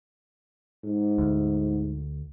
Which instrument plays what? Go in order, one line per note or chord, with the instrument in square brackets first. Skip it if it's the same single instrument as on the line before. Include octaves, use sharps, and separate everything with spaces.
[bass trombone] G#2
[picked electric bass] D2